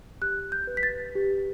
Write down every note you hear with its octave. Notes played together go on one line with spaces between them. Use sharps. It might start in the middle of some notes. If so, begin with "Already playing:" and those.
G4 F#6
G6
B4
B6
A6
G4